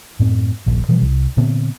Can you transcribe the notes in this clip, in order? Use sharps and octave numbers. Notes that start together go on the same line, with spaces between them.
F#2 A2 C4
D#1 A#1
B2 E3 F3 G3
C2
A#2 D3 B3 C4